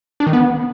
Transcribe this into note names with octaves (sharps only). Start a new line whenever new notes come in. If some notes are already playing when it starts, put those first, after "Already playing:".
D4
D#3
B3